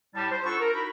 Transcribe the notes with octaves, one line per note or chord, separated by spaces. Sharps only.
A2 G3 A5
C5
D4 E4 F4 A4 F#5 C#6
A#4
D#4 E4 F#4 B5